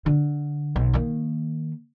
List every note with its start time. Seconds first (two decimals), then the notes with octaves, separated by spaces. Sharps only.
0.06 D3
0.76 B1
0.93 D#3 A#3